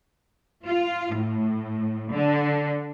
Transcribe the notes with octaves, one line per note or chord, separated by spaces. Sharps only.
F4
A2
D3